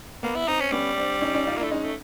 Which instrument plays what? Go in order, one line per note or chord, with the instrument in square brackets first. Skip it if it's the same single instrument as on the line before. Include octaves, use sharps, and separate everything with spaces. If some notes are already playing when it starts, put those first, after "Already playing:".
[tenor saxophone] A#3 [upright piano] B3
[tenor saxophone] E4
[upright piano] C4 [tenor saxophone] D#4
[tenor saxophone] C#4
[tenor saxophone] G3 [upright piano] B3 C#4
[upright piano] C4 D4
C#4 D#4
C#4 D#4
D#4 F4
[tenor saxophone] A#3 [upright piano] D4 E4
[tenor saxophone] A3
[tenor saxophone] G#3 [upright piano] C#4 D#4
[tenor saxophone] A3